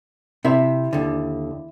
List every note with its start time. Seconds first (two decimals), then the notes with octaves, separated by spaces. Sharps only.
0.45 C3 E4 E5
0.93 D#2 D3